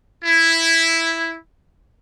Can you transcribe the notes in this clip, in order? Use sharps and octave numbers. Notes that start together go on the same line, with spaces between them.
E4